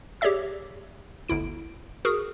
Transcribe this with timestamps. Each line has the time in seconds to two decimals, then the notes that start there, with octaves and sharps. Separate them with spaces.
0.21 G4 G#4 C#5 D5 E5 E6
1.28 G1 D2 E4 D7
2.05 F#4 G#4 A#4 D#6 F6